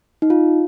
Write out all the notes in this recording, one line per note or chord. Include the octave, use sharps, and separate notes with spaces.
D#4
F4